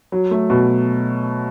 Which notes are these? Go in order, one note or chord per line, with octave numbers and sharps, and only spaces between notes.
F#3
A3
B2